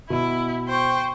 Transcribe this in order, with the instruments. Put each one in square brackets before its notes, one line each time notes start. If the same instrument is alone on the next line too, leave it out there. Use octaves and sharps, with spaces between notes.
[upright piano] B2 [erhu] E4
[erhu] C5 [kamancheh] G5 C#6